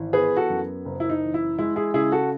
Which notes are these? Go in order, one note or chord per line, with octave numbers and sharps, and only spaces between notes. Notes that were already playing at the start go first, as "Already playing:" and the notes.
Already playing: G#1 E3
B3 G#4 B4
F#4 A4
F#2
F#1
E4
D#4
E3
E4
G#3 E4
E4 G#4
C#3 E4 G#4
F#4 A4